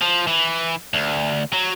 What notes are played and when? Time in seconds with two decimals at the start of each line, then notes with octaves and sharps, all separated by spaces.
0.02 F3
0.27 E3
0.93 D2
1.53 F#3